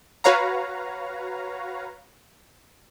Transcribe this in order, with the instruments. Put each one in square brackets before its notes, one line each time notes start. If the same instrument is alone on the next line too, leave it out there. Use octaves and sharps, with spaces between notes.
[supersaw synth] F#4 B4 C#5 F5 A#5